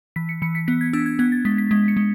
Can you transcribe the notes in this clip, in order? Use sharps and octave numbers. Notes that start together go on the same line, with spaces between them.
E3 B6
C#7
E3 C#7
B6
B3 B6
G#6
D4 E6
G#6
B3 G#6
A6
G#3 B6
B6
G#3 B6
C#7
G#3